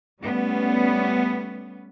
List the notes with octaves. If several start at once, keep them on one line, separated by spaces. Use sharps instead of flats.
G3 A3 B3 C#4